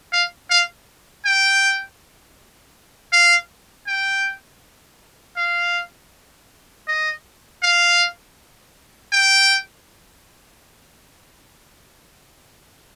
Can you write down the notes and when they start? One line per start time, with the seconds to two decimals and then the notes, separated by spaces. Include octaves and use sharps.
0.12 F5
0.50 F5
1.25 G5
3.13 F5
3.87 G5
5.37 F5
6.88 D#5
7.63 F5
9.12 G5